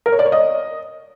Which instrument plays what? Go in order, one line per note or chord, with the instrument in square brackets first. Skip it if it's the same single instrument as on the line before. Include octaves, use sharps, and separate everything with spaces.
[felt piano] A#4
C#5
D5
C#5
D#5